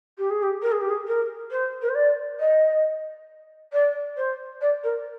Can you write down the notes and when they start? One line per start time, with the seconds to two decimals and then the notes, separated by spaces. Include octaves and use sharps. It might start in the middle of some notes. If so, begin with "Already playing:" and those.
0.18 G4
0.30 G#4
0.43 G4
0.62 A#4
0.72 G#4
0.81 G4
0.89 G#4
1.07 A#4
1.51 C5
1.82 A#4
1.89 C5
1.95 D5
2.40 D#5
3.73 D5
4.17 C5
4.61 D5
4.84 A#4